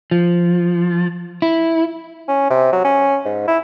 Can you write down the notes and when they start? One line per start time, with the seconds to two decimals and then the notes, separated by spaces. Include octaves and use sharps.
0.11 F3
1.42 E4
2.28 C#4
2.50 C3
2.72 F#3
2.84 C#4
3.25 G#2
3.48 E4